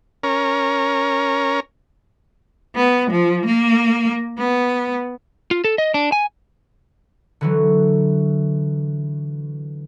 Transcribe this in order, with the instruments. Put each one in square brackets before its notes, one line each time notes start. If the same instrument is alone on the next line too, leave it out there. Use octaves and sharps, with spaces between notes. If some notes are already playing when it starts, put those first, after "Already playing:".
[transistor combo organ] C#4 A#4
[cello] B3
F3
A#3
B3
[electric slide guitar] F4
A4
D#5
D4
G#5
[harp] D3 E3 F#3